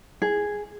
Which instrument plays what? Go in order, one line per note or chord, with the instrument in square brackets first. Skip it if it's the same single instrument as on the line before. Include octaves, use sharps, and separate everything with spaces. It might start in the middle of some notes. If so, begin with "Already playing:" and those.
[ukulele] G#4